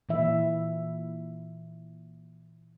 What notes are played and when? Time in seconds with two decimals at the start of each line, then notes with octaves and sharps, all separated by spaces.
0.09 A#2 E3 E5